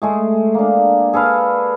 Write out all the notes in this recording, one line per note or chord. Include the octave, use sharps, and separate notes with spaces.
G#3 A3 G#4
A#3 D4
G#4 A4 B4 F5